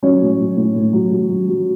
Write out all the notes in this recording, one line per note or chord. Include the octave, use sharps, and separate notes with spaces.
F#3 C#4 C#5
A2
F#3
A2
A2
F#3
F#3
F#3
F#3